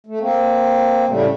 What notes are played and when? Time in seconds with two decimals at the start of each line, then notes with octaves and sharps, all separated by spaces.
0.07 A3
0.20 A#3 C4
1.08 A2 C#3 G3 A3